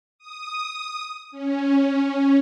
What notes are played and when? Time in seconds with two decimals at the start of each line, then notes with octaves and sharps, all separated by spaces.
0.18 D#6
1.32 C#4